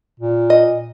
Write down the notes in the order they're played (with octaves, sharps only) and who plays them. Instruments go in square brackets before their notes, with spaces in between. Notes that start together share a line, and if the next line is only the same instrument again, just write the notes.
[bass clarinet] A#2
[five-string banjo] D#5